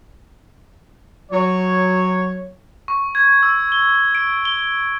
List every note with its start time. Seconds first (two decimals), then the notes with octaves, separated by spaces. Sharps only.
1.32 F#3 C#5
2.88 C#6
3.15 G#6
3.43 E6
3.72 G7
4.15 D7
4.45 G7